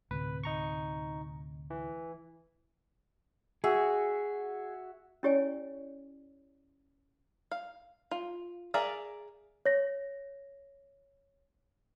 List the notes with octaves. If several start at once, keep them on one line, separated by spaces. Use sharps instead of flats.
D2 A2 C3 B4
D#4 A#5 C#6
E3
F#4 G#4 E5
C#4 E4 G4 C#5 D5 G#5
F5
F4
G#4 A#4 D5 E5 F5
C#5 A#6